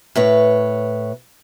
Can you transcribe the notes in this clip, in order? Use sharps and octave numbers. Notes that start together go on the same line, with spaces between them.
A2 B4 C#5